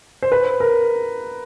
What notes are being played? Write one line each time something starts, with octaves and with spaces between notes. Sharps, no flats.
C5
B4
A#4